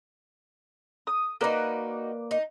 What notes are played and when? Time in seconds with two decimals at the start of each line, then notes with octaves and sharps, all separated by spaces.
1.07 D#6
1.41 A#3 D#4 F#4 B4 D5
2.31 D#4